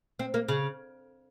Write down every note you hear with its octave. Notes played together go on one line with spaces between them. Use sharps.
C4
A#3
C#3